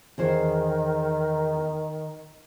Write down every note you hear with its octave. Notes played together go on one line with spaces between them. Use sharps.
E2 D#3 G#4 C5